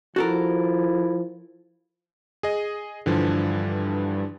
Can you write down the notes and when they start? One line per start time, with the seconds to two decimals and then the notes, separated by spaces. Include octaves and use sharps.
0.16 F3 E4 F#4 A4 A#4
2.43 G#4 D#5
3.06 G2 D3 E3 F3